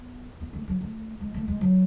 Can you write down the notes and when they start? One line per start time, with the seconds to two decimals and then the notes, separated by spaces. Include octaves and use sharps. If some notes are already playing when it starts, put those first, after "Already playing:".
Already playing: B3
0.40 B3
0.53 A3
0.68 F#3
0.81 A3
1.20 G#3
1.34 A3
1.48 G#3
1.61 F#3